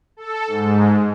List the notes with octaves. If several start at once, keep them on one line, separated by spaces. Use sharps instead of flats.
A4
G#2